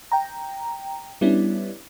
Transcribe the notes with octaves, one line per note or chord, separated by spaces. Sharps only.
G5 A#5
G3 B3 C#4 D4 E4